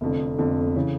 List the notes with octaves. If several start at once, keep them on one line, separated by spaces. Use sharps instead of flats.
F1 F2 D3
F1 F2 D3
C#3 E3